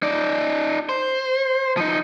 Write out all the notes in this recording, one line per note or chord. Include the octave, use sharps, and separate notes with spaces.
D#4 D5
C5
F3 D#4